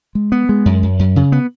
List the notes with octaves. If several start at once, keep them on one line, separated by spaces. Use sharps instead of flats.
G#3
B3
G#3
F#2
F#2
F#2
C#3
B3